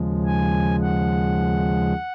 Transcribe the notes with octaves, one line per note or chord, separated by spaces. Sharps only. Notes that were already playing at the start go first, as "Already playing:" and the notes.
Already playing: D#2 C#3 F3 G#3
G#5
F#5